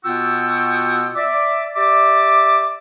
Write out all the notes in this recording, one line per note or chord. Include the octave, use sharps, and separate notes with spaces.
B2 B3 F4 F#4 G5 E6
D5 E5 D6
G4 D5 E5 D6